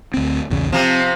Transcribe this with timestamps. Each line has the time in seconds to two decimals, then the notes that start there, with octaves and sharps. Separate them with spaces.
0.14 D2 C4
0.50 A#1 E2 C#3
0.72 C3 F3 C4